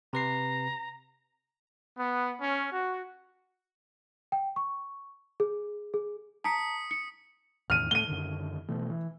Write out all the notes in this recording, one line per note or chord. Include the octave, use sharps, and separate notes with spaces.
C3 B4 A#5 C7
B3
C#4
F#4
G5
C#6
G#4
G#4
A5 A#5 D#6 B6 C#7
C#7
E2 A2 D#3 F6 D#7
A2 A3 D#7 G7
F#2 D3 D#3
B2 E3 A3
E3